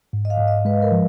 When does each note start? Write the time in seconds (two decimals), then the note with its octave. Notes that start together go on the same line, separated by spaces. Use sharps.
0.13 G#2
0.25 D#5
0.30 F5
0.40 G#2
0.48 D#5
0.65 G#3 B4
0.82 A#4
0.92 F3